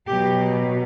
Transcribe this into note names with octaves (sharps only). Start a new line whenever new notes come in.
B2 F#3 G4